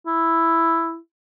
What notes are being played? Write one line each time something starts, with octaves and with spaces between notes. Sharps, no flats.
E4